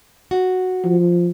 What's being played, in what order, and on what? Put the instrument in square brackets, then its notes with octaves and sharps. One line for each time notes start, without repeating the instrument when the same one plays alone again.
[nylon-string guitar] F#4
[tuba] F3